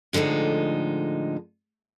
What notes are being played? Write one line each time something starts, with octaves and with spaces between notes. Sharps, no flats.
A2 D3 F3 G#3 D#4